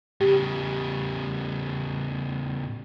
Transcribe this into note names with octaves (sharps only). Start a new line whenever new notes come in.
A2 C#3 G4